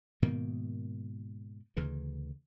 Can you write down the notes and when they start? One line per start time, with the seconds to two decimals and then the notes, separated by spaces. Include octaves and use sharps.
0.22 G#2 B2 D#3 A#3
1.77 D2 C#3 E3